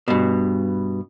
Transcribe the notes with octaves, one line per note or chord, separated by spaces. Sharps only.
G2 B2